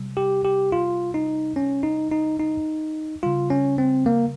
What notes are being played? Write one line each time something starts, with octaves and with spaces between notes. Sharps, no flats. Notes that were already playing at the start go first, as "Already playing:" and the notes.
Already playing: C3 G3
G4
G4
F4
D#4
C#4
D#4
D#4
D#4
C#3 G3 F4
C#4
C4
A#3